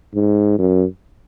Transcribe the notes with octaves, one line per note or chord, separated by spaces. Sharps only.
G#2
F#2